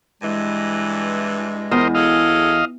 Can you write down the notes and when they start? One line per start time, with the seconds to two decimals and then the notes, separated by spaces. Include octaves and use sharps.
0.22 G2 E3 G#3
1.72 E2 A#4 C5 D#5
1.95 F#3 G#4 A4 D#5 F5